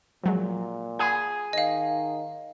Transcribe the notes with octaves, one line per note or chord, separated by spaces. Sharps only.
A#2 F3 F#3 G#3
G#4 F#5 G#5 B5
D#3 D#5 F5